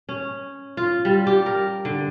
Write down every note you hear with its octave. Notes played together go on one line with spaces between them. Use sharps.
C#4
F4
G3
G4
A#4
D3